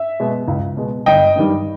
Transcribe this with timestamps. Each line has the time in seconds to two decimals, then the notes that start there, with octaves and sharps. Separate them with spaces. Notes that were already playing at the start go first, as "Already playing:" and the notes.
Already playing: E5
0.20 B2 G#3
0.48 C#2
0.77 B2 G#3
1.06 G1 D#5 G5
1.36 G2 D#3 G3